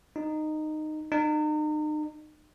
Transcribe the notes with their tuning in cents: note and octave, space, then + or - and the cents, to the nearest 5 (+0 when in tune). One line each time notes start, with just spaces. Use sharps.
D#4 -15
D#4 -40